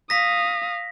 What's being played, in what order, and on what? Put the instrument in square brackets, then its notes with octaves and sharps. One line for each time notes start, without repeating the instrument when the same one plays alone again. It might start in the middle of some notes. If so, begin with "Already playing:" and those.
[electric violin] F5 D#6 [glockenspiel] A#6 B6